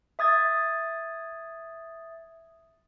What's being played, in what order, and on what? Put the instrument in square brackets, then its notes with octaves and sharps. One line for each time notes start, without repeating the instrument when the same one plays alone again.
[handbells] E5 D#6 G#6 A6